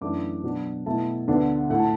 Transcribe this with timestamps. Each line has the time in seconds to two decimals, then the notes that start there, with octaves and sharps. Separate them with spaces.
0.01 F#2 E3 A3 D4 D6
0.44 B2 F#3 D4
0.86 B2 A3 E4 A5
1.28 D2 D3 B3 D4
1.70 A2 A3 E4 F#5
1.80 A5